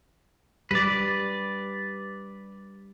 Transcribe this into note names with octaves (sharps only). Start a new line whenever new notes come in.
G3 B4 D5